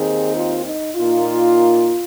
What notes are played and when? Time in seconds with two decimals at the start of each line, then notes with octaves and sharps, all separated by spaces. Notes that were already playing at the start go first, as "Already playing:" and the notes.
Already playing: D#2 D#3 C4 D#4 G#4
0.36 F4
0.66 D#4
0.96 A#2 A#3 D#4 F4